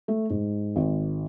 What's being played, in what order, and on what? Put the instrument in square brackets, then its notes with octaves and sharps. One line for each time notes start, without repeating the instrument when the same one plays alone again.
[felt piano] A3
G#2
G#1